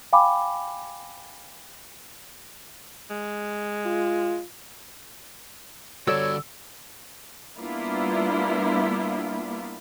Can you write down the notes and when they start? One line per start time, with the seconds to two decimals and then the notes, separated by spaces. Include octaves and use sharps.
0.13 F5 G5 G#5 B5 D6
3.10 G#3
3.86 F4
6.07 D3 G3 F#4 A4 C#5 D5 E6
7.58 G3 A#3 B3 D4 E4 F4